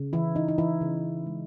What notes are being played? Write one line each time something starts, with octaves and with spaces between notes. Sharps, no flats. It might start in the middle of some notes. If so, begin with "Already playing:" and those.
Already playing: C#3
E3 E4
E3 D#4
D#4
E3 E4
C#3
G#3